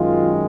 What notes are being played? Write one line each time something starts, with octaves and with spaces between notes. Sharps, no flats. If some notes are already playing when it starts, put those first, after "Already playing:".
Already playing: F#2 D#3 G#3 F4